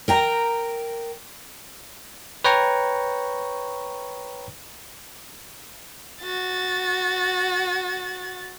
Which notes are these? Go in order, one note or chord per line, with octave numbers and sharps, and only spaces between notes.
A#4 G5 A#5
B4 C#5 G5 A#5 C#6
F#4 A6